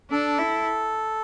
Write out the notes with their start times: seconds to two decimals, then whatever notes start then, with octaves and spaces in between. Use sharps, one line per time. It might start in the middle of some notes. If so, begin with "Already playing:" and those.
0.11 D4 A4
0.39 E4